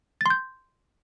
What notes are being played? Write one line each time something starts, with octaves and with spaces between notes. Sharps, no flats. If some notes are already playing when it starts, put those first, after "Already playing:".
C6 G6 A6